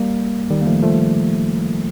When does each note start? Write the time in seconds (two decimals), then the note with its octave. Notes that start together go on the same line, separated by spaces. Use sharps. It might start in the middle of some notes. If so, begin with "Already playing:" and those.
Already playing: G3 A#3
0.50 D#3 G3
0.61 A#3
0.66 F3 A3
0.82 F3 A3